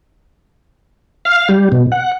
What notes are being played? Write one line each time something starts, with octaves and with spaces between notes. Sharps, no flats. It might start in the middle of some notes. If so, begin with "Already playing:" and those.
F5
G3
B2
F#5